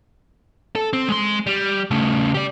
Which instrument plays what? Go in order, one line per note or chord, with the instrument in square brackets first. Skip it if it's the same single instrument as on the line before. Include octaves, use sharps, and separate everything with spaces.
[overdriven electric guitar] A4
C4
G#3 C6
G3
C#3 A3
G4 D5